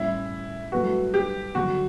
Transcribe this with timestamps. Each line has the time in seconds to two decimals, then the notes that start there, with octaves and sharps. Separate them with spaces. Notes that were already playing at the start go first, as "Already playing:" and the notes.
Already playing: A2 G3 C#4 E4
0.72 G2 F#3 A3 E4 F#4 B4
1.14 G4
1.55 F#2 D3 G3 F#4